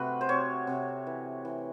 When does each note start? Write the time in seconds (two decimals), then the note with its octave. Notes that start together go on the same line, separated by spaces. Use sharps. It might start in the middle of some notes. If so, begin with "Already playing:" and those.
Already playing: C3 A3 F#4 B4
0.21 C5
0.29 C3 C#5
0.67 C3
1.07 E3
1.45 E3